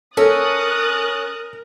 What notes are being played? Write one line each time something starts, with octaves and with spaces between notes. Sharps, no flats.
C#4 A4 A#4 D#6 F#6 A6